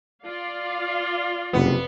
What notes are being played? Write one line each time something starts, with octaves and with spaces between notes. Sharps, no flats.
F4 D5 F5
F#1 F2 C3 B3